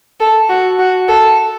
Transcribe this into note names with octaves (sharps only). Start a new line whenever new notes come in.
A4
F#4
F#4
A4